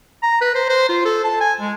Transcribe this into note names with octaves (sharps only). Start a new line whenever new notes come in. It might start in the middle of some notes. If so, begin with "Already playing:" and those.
A#5
B4
C5
C5
F4
A4
A5
G#5
G#3